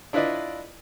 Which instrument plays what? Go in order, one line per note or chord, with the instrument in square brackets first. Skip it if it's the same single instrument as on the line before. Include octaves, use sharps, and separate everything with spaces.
[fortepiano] D4 E4 F4 B4 D5 D#5